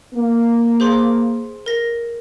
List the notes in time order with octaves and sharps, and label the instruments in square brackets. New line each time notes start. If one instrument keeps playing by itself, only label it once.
[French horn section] A#3
[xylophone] G#4 C5 C6
A#4 A#6